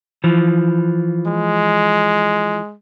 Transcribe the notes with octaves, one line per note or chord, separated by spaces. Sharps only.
E3 F3
G#3